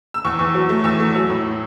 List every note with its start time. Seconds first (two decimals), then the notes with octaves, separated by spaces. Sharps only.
0.14 E6
0.25 E2 C#6
0.39 E2
0.54 F#3
0.69 A3
0.84 E2 E6
1.00 A3
1.15 F#3
1.30 A2